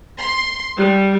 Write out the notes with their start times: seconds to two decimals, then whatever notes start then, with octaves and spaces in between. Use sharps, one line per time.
0.20 C6
0.77 G3